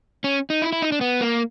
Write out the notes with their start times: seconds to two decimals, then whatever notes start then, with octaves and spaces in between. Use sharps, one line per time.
0.24 C#4
0.50 D#4
0.62 E4
0.73 E4
0.82 D#4
0.92 D4
1.01 B3
1.21 A#3